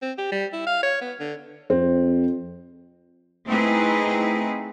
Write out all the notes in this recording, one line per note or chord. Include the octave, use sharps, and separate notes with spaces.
C4
G4
G3
E4
F5
C#5
B3
D3
F2 C4
A3 C4 D#4 E4 G#4 B4